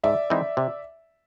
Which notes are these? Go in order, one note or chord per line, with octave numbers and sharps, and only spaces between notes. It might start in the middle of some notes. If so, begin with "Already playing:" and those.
G#2 D5 E5
E3 G#3 C4 D#4
C3